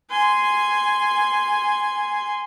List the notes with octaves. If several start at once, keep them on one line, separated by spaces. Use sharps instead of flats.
G#5 C6